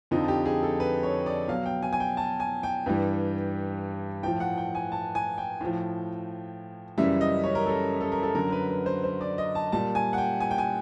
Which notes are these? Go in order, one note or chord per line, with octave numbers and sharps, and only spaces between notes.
F2 D3 F3 D#4
G4
G#4
A4
B4
C#5
D5
B2 F#3 F5
G5
G#5
G#5
G5
A5
G#5
G5
G2 E3 G3
A2 F3 G5
F#5
G5
G#5
A5
G#5
G5
A2 F3
F#2 C#3 E3 G3 E5
D#5
C#5
A#4
A4
A4
A#4
A4
F#2 D3 F#3 A#4
B4
B4
C5
C5
D5
D#5
A5
A#2 G3 A5
G#5
F#5
G5
G#5
G5
G#5